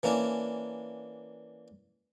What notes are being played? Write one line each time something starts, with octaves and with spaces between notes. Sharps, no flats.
E3 A#3 C#4 D4